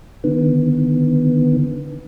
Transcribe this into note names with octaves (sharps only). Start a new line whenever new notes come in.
D3 D#3 B3